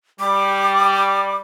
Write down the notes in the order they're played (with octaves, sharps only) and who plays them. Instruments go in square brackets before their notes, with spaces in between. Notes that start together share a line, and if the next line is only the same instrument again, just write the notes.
[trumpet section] G3 [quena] D6